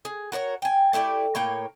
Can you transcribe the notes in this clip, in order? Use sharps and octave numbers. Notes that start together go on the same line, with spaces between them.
G#4
F#4 A#4 C5 C#5
G5 G#5
A3 E4 G4 D5
A2 A#3 C#5 G5